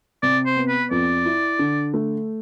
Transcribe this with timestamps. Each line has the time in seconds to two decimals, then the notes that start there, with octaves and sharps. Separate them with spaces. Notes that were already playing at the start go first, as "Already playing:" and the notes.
0.23 C3 D5
0.46 C5
0.56 B3
0.68 B4
0.91 F2 D5
1.25 E4
1.59 D3
1.94 A3